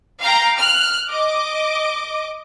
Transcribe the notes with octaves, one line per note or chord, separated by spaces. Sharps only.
F5 G5 A#5
F6 F#6
D#5 D6